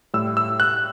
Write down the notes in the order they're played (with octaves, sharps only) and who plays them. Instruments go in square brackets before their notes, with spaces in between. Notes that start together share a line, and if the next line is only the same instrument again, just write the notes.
[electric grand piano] A2 G3 E6
E6
F#6